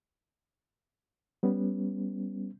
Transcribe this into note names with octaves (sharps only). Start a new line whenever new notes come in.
G3 B3 C#4